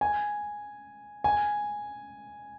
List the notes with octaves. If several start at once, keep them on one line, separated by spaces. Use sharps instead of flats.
G#5
G#5